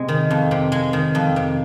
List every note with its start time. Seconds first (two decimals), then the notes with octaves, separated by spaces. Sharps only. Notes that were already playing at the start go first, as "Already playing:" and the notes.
Already playing: C3 G#3
0.09 D#3
0.31 F2
0.51 C3
0.72 G#3
0.93 D#3
1.15 F2
1.36 C3